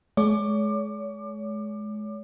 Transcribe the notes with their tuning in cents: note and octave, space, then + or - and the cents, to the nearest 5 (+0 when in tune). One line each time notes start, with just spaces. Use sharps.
G#3 +35 C#5 +40 D6 +25